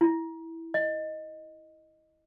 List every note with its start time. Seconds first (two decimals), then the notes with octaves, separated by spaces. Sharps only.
0.01 E4
0.74 D#5